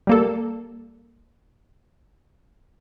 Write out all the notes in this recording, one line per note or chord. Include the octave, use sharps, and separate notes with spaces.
G3 A#3 A4